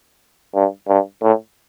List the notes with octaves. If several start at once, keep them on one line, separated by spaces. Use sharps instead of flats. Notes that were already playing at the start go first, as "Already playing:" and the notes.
G2
G2
A2